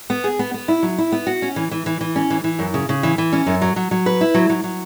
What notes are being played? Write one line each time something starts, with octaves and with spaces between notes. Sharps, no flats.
B3
G#4
B3
B3
E4
F#3
E4
B3
F#4
C#4
E3
E3
E3
E3
C#4
E3
E3
F#2
C#3
C#3
E3
E3
C#4
F#2
F#3
F#3
F#3
B4
E4
F#3
F#3
F#3